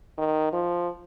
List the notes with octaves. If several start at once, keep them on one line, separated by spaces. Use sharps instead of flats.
D#3
F3